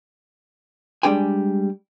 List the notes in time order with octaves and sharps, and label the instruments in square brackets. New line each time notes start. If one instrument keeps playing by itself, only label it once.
[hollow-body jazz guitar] G3 G#3 D4 G#4 G5 G#5